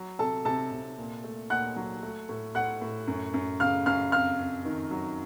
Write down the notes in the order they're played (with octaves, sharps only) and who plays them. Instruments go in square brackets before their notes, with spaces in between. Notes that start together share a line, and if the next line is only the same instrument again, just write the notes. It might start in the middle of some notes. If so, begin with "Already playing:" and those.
Already playing: [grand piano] F#3
C3 A4 A5
C3 A4 A5
C3
A#2
A3
A#2 F#5 F#6
F#3
A3
A2
A2 F#5 F#6
A2
F#2
F#2
C#3 F5 F6
F#2 F5 F6
F2 F5 F6
F2
D#3
F#3